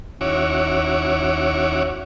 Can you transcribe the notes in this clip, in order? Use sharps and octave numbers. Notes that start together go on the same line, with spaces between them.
D#2 C#4 E4 F#4 C#5 D6